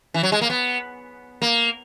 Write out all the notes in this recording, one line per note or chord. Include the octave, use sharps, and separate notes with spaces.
E3
F#3
G#3
A#3
B3
A#3